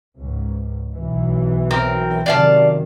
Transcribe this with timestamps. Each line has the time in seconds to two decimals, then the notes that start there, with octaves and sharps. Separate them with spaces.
0.18 C#2 G#2
0.94 B1 E3
1.71 C4 A#4
2.26 F#2 C3 D#3 D5 F5 A5